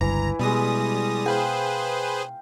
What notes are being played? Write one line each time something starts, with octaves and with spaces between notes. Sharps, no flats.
G1 C#2 G2 E3 A#5
B2 G3 G#3 E4 D#6 A#6
G#4 B4 C5 F5 G5